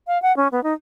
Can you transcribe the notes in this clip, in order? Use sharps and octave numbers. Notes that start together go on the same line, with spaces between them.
F5
F#5
C#4
B3
D#4